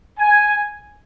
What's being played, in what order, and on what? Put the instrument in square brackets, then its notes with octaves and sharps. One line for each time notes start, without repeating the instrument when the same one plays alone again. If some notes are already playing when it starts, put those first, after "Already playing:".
[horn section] G#5